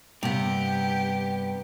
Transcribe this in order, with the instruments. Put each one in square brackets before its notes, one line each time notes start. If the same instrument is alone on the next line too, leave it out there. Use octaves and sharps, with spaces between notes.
[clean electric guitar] G2 [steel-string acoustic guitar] C3 B3 [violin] G4